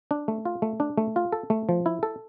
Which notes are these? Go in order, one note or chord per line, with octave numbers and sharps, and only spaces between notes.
D4
A3
F4
A3
D4
A3
F4
A4
A3
F3
E4
A4